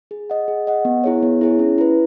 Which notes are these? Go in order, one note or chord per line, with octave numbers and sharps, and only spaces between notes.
G#4
D#5 F#5
G#4
D#5 F#5
B3
E4 G#4 C#5
B3
E4 G#4 C#5
C#4
E4 B4